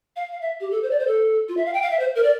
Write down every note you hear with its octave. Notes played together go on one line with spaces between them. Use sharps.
F5
F5
E5
G4
A4
C5
D5
C5
A4
F4
E5
F5
G5
F5
E5
C5
A#4
D5